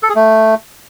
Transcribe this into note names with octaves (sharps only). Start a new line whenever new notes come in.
A4
G#4
A3